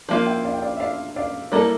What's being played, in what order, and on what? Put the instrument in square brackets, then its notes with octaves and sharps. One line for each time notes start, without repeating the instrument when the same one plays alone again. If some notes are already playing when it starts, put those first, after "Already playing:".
[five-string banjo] F3 A#3 F4 [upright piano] D5 F5
[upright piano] E5 G5
D5 F5
G5
D5 F5
E5
D5 F5
D5 F5
[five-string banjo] G3 A#3 E4 A4 [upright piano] A#4 D5